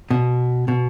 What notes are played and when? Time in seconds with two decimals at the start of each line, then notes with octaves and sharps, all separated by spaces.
0.11 B2
0.68 B2